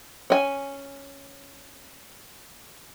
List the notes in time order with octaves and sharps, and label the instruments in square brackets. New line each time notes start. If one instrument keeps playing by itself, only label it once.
[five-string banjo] C#4 G#5